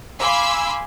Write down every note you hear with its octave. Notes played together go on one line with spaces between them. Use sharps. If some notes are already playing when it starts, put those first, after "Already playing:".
F5 G#5 B5 C6 D6 E6